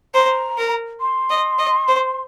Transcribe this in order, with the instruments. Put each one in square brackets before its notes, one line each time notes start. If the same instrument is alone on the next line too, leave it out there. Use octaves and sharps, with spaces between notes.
[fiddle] C5 [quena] A#5
[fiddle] A#4
[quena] C6
[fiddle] D#5
D#5
C5